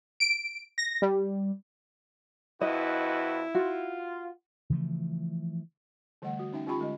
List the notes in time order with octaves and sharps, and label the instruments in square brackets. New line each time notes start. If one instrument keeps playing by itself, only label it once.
[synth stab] D7
A#6
G3
[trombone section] F2 F#4 B4 [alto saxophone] E4 [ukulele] D#5
[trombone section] F4 [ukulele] F#4
[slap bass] C#3 E3 F3 A3
[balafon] D3 E3 G3 A3 F#5
F#4
C#4 D#4 E5 G5
C#4 F4 G4 G5 B5 C#6
D3 G#3 D#5